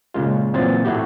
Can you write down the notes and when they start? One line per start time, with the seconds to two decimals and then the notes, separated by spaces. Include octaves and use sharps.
0.14 A#2 C#3 G#3 F4
0.54 A#2 E3 F#3 C4 C6 A6
0.85 A2 A3 E4 F#4 G4